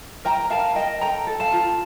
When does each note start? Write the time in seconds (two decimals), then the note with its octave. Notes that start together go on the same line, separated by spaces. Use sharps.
0.25 A#4 G5 A#5
0.50 A#4 F5 A5
0.76 A#4 D#5 G5
1.01 A4 G5 A#5
1.27 A4
1.40 F5 A5
1.52 F4